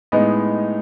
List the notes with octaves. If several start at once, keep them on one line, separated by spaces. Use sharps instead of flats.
A2 G#3 B3 D#4 D#5